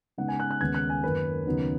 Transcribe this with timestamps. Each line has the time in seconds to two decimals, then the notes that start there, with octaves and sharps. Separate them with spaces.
0.18 C#3 G#3 B3 D#4 F#5
0.28 G#5
0.40 F#6
0.51 F#6
0.61 D#2 C#3 G#3 B3 G#6
0.74 F#6
0.90 G#5
1.03 F#2 D#3 A#3 C#4 B4
1.46 D#2 C#3 F#3 B3 D#4